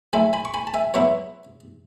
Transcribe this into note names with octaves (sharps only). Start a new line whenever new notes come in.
F#3 A3 E4 G#5 B5
G#5 B5
C#6
G#5 B5
A5
E5 G#5
F#3 B3 E4 C#5 E5